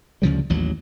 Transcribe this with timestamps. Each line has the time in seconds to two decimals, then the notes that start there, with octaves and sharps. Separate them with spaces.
0.22 D2 C#3 F3 G3
0.49 A1 D#2 F#3